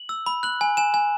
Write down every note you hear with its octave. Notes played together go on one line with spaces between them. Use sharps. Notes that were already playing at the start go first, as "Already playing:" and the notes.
Already playing: F#7
E6
B5
F#6 F#7
G#5
G#5 E7
G#5